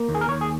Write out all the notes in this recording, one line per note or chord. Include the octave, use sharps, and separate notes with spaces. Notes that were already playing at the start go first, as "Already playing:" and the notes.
Already playing: A#3
D#2
G#4
A#4
D#2 C#5
G#4